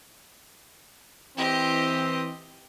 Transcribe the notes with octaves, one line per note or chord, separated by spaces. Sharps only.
E3 C4 G4 D#5